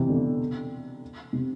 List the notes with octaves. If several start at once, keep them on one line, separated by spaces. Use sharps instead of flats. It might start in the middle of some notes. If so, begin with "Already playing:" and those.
Already playing: C3 E3
B2 D3
C3